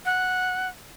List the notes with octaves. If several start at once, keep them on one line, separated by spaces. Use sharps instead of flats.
F#5